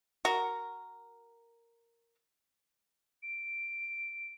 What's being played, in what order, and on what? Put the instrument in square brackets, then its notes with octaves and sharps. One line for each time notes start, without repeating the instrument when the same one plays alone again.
[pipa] F#4 A#4
[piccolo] D7